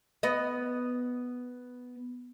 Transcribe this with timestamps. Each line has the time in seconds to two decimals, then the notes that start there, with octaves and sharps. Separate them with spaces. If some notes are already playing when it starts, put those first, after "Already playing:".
0.23 B3 D#5